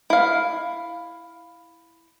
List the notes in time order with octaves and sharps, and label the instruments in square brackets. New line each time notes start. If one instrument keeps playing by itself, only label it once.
[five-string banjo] E4 F5